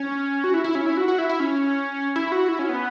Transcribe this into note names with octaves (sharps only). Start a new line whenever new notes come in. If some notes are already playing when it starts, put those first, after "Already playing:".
Already playing: C#4
F#4
E4
E4
C#4
E4
F#4
F#4
E4
E4
C#4
E4
F#4
E4
C#4
B3